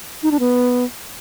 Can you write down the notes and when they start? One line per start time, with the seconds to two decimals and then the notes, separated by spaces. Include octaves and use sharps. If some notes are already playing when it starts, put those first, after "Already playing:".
0.23 D#4
0.31 D4
0.40 B3